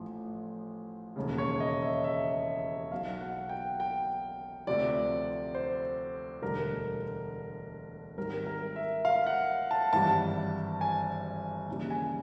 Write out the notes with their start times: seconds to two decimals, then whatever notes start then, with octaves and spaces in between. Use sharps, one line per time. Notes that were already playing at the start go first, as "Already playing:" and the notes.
Already playing: A1 A2 F3
1.16 E1 D#2 C#3
1.38 C#5
1.60 D#5
1.82 E5
2.04 E5
2.92 B1 B2 F#3 F5
3.21 F#5
3.49 G5
3.80 G5
4.67 D2 C3 F3 D5
5.55 C5
6.42 E1 D2 D3 G3 A#4
8.17 G#1 G#2 D#3 G3 A#4
8.46 A#4
8.76 E5
9.05 F5
9.27 F#5
9.71 A5
9.93 G#1 G2 E3 G3 A5
10.81 G#5
11.68 D#2 C#3 E3 G3
11.90 G#5